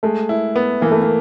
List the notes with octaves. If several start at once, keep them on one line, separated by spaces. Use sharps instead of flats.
G#3 A3
E4
B3
E3 A#3
A3
A#3